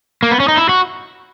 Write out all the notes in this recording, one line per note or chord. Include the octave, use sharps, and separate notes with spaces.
A#3
B3
C#4
D#4
E4
F#4